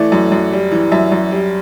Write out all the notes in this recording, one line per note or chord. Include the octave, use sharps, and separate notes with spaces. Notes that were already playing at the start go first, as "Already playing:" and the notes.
Already playing: E3 A3 D5
F#2
F#2
G3
E3
F#2 E5
F#2
G3